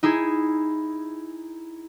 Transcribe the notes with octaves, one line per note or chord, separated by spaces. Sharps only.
D#4 E4 G#4